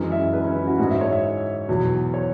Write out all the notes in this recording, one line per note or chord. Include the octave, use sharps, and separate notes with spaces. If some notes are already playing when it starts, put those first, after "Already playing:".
Already playing: F#2 E3 G#3
E5
B4
C#4
E4
F#4
G#2 G#3 F#4
E5
C#5
E5
E2 B2 F#3
C#5